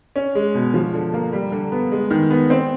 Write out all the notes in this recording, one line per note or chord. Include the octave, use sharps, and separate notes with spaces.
C#4
G#3
B2
F3
D3
A#3
G3
D3
B3
G#3
D#3
B3
C4